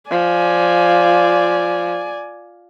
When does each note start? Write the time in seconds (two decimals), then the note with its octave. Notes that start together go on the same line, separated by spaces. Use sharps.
0.11 F3 D5 G#5